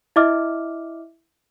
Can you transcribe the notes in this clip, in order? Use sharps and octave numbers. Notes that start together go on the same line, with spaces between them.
E4 D#5 E5 D6 F6